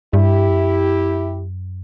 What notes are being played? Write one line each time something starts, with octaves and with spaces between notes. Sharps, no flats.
G2 E4 G4
F#2